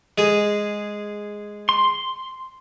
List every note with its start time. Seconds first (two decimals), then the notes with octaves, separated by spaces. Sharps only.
0.18 G#3 G#4
1.69 C6